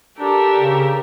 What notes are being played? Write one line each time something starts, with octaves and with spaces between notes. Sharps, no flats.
D4 G4 A4 A#4
C#3